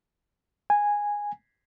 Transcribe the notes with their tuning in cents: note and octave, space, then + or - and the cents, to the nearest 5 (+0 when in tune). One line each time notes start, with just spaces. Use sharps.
G#5 -10